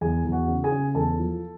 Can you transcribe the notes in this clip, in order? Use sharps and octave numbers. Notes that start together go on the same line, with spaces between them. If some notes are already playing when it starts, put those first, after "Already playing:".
E2 G#4 G#5
E2
F#4 F#5
C#3
G#4 G#5
C#3
E2 A4 A5
F3